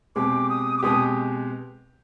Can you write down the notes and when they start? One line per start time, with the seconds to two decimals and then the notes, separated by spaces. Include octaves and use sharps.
0.16 B2 G#3 C4 G4 D6
0.50 D#6
0.78 D6
0.83 B2 G#3 C4 G4 D#6